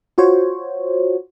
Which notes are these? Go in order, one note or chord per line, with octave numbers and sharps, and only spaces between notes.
F4 F#4 C5 C#5